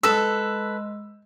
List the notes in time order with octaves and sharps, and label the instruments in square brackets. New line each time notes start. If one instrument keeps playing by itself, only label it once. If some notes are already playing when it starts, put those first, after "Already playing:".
[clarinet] G#3 [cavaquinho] A4 B4 [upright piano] E6